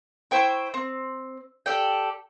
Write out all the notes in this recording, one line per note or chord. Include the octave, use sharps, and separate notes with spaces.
E4 C5 G5 C#6
C4
G4 A4 D5 G5